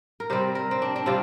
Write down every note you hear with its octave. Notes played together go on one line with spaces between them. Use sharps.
A#4
C3 G3 C4 C5
A#4
C4
D4
D4
C3 G3 C4 F4